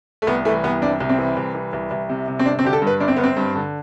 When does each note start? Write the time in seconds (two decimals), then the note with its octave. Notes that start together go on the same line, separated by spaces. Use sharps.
0.22 A3
0.27 C2 B3
0.45 E3 A3
0.64 C2 B3
0.82 C3 D4
1.00 C2
1.09 C4
1.18 E3
1.37 C2
1.55 E3
1.73 C2
1.91 C2
2.09 C3
2.28 C3
2.39 C4
2.46 G1 D4
2.59 C4
2.64 D3 G4
2.73 A4
2.82 G2
2.87 B4
3.00 G1 D4
3.08 C4
3.16 G1 B3
3.24 C4
3.37 G2
3.55 D3